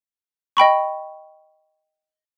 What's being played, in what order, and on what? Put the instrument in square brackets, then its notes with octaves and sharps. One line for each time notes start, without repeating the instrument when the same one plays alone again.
[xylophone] D#5 G5 B5 C#6